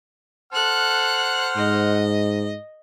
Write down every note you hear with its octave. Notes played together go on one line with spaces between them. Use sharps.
A4 C5 F#5 F6 F#6
G#2 D#5